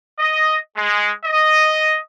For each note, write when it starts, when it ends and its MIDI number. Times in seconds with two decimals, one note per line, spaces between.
0.19 0.57 75
0.77 1.11 56
1.25 1.98 75